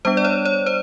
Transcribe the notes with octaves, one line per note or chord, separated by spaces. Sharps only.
G3 B3 D4 C5
D5
C#5
C#5
C5